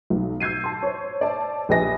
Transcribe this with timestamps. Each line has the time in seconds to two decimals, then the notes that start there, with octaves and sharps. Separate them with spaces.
0.10 B1
0.40 E6 G6 G#6 C7 D#7
0.64 A5 C6
0.83 C5 C#5
1.21 D5 A5
1.69 A#1 G4 B4 D#5 G#5 A#6